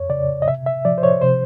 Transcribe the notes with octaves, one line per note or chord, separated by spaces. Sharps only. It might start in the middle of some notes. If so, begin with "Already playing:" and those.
Already playing: F2 C#5
C#3 D5
D#5
C3 E5
E5
F3 D5
C5
C#5
C3 C5